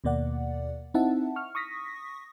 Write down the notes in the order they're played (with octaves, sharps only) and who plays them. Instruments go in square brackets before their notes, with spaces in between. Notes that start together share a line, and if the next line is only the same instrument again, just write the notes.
[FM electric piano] D#2 B2 A#3 D5 F#5
C4 D#4 E4 E5 F#5 A5
C#6 F6
C#6 D#6 A#6 B6